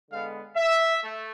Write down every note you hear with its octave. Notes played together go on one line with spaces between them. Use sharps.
D3 G#3 B3 F5
E5
A3